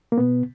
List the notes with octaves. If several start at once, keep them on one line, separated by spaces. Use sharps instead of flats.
A#3
B2 B3